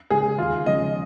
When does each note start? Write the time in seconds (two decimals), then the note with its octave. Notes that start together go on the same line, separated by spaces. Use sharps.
0.10 C#3 G#3 C#4 G#4
0.38 D#2 F4
0.66 C#3 F3 G#3 D#5